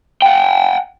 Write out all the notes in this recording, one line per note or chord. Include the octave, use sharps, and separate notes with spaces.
F#5 G5